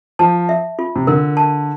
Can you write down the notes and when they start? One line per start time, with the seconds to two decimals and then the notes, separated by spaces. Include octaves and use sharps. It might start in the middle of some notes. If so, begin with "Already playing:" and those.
0.19 F3 A5
0.49 E5
0.79 F4
0.96 C3
1.07 D3 A#4
1.37 A5